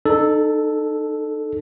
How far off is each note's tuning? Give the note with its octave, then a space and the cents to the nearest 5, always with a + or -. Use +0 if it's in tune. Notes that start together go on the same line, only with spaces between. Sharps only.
D#4 -35 A4 +0